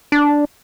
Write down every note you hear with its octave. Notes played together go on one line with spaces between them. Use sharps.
D4